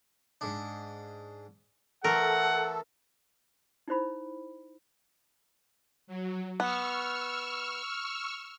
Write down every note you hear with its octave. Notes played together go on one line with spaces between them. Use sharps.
G#2 D4
E3 A3 A4 A#4 F#5
D#4 E4 C5 B5
F#3
B3 C#6 E6 F6